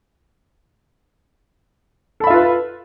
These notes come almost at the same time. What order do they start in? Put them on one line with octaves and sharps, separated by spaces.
A4 B5 E5 F4 B4